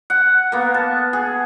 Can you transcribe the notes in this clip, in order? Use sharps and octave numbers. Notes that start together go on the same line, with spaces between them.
F#5
A#3 B3
A5
G#4